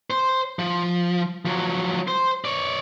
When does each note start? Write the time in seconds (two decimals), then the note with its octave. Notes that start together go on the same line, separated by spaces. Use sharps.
0.10 C5
0.59 F3
1.45 F3 F#3
2.08 C5
2.45 C#5 D5